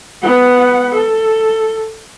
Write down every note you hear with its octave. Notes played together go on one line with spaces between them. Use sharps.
B3 F#5
A4